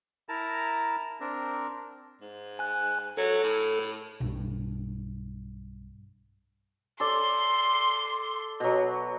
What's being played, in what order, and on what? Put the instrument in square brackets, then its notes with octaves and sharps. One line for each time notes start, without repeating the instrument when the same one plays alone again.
[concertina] E4 A#4 A5 A#5
C4 D4 A#4
[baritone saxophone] G#2
[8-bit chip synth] G#5 F#6
[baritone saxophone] F#3 [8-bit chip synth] A4
[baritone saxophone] A2
[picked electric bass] B1 G2
[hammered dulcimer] A4 D5 [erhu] C6
[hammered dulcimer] B2 F#3